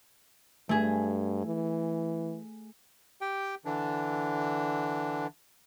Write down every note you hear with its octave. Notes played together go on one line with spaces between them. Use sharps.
G2 A3 G#4
E3
G4 G5
D3 E3 D4